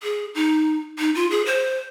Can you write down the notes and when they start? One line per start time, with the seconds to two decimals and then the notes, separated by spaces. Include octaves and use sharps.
0.03 G#4
0.35 D#4
0.99 D#4
1.15 F4
1.31 G#4
1.46 C5